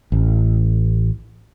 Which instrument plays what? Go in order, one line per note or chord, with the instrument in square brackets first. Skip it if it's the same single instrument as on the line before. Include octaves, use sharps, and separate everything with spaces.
[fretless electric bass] A1